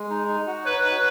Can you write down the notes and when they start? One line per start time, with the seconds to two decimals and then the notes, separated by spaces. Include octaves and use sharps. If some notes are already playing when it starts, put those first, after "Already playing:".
Already playing: G#3
0.10 D#4
0.28 D#4
0.47 F#4
0.65 B4 C#5
0.84 D#4